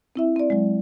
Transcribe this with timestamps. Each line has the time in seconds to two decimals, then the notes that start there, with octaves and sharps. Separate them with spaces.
0.16 C4 E4 E5
0.36 C4 D5
0.50 F#3 G#3